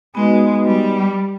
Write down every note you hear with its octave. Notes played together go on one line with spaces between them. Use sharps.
G#3 B3 D#4 F#4 B4 D#5
G3